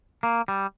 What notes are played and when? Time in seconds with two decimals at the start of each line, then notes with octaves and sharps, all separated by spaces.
0.23 A#3
0.48 G3